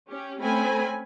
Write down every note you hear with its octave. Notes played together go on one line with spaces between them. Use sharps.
C#4 G4
A3 C4 C#4 G#5 B5